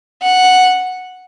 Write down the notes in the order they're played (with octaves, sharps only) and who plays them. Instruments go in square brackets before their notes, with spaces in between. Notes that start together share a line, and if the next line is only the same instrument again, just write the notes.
[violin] F#5